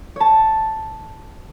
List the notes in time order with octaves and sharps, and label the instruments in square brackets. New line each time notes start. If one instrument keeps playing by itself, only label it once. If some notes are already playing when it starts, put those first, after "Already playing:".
[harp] C#5 A5